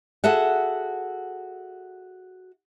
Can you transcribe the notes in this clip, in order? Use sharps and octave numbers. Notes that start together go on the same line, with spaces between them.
F#4 G#4 A4 E5 F#5